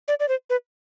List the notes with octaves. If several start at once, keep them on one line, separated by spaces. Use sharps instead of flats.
D5
D5
C5
B4